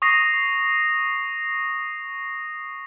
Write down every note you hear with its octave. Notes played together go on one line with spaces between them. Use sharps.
C#6 D#6 A#6 C7